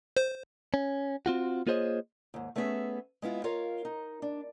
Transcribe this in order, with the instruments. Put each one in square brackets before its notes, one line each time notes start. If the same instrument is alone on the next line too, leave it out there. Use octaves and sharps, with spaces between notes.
[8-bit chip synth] C5
[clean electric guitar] C#4
C4 F4 F#4
A#3 F4 G#4 C5 C#5 D#5
[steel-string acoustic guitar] D#2 G#2
A3 B3 C#4 E4 G#4 E5
G#3 B3 E4 F4
F4 A#4 C#5 F5
D#4
D4